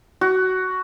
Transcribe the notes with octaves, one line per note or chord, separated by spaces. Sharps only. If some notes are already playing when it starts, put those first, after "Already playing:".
F#4